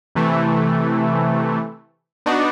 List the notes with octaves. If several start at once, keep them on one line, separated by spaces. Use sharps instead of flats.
C3 E3 A3
B3 D4 D#4 F#4